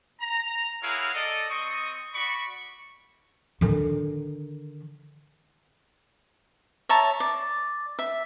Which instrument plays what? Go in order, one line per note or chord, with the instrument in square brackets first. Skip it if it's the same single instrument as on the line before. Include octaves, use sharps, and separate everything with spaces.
[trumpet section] A#5
E4 G#4 A#4 C#5 F5 F#5
A4 D5 D#5
C4 D#5 C#6 D#6
F#4 D5 B5 C#6
[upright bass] D3 D#3
[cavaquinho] C#5 E5 A5 A#5
D5
E5